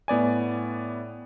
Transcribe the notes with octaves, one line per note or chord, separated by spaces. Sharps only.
A2 B3 D5 G#5